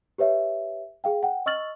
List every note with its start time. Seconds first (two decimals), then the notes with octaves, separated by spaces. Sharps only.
0.18 G4 B4 C#5 E5
1.04 G#4 F5 G5
1.23 F#5 G5
1.46 D#5 C#6 E6 F6 A6 F#7